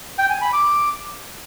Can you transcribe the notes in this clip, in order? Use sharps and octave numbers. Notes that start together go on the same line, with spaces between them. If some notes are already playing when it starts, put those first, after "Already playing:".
G5
G#5
B5
D6